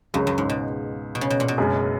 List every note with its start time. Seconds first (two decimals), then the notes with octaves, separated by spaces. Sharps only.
0.14 C#2 F#2 C#3 G#3
0.27 F#2
0.38 G#2
0.50 B2
1.15 B2
1.21 C#3
1.30 B2
1.40 A#2
1.48 B2
1.58 F#1 F#2 C#3 G#3